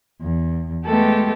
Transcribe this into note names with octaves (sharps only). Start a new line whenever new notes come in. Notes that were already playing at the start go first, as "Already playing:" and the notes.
E2
G#3 A3 B3 G4 A4